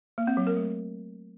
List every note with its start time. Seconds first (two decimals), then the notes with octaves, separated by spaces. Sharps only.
0.18 A#3
0.27 C4
0.37 F#3
0.47 A#4
0.56 A3